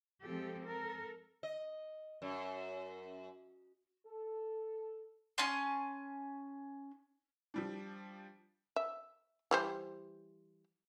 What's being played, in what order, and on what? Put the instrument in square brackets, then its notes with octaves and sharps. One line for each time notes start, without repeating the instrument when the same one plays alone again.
[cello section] F3 G#3 C4 G4 A4
A4 A#4
[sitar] D#5
F#2
[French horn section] A4
[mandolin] C#4 G#5 A5 C6
[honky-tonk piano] F3 G3 D4
[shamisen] E5
E3 G3 C5